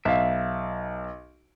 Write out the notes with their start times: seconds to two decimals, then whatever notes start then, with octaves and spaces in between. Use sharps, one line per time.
0.05 B1 E5 F5